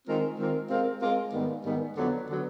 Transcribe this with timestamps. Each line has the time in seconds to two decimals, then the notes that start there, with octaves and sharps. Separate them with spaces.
0.07 D#3 G#3 C4 F4 A#4
0.39 D#3 G#3 C4 F4 A#4
0.70 G#3 C4 F4 A#4
1.01 G#3 C4 F4 A#4
1.33 G#2 D#3 G3 B3
1.65 G#2 D#3 G3 B3
1.96 F2 D3 F#3 B3
2.29 D3 F#3 B3